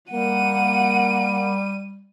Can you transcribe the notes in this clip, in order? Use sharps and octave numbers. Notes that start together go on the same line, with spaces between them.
G3 A#3 F#5 D#7